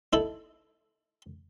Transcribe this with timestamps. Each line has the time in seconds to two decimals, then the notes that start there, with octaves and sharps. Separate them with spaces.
0.13 D#4 E4 A4